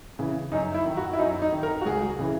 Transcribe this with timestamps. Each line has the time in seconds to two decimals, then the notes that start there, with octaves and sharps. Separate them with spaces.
0.19 C#3 E3
0.52 F#2 D#4
0.74 E4
0.86 D#3
0.97 F#4
1.13 E4
1.19 F#2 D#4
1.42 D#4
1.52 D#3
1.63 A#4
1.81 F#4
1.85 C#2 G#4
2.19 C#3 E3